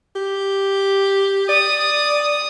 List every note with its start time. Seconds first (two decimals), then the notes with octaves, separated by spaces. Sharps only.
0.16 G4
1.49 D5 D#6